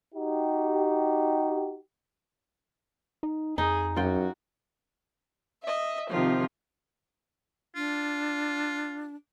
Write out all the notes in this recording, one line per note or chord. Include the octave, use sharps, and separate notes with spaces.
D#4 F#4 G4
D#4
F2 D#4 G#4
F#2 F4 F#4 G5
D#5 E5
C3 D#3 F3 F4
D4 F4